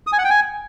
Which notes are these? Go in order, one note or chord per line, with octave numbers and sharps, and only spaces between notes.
D#6
G#5
F#5
G5
G#5